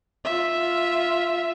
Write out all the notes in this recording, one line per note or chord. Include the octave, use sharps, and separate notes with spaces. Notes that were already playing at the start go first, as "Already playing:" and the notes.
F4 E5